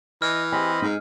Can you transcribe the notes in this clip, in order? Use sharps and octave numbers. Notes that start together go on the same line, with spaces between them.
E3 D#5 F6
C4 G4 G#4 D#5 G#5 B5
G#2 D#4 G#4